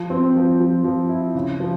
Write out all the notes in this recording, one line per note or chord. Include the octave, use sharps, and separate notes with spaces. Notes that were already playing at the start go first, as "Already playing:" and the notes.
Already playing: F3
C4
F3
F3
F3
E4
C#3
F3